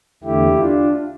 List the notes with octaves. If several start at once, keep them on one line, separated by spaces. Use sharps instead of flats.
E2 D3 A3 E4 G4
D4 F4